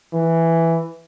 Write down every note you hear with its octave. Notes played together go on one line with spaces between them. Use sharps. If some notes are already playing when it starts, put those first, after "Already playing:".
E3